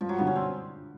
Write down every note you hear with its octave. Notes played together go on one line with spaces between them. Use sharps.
G2 F3
F#3
D3 G3 B3
C#4
C4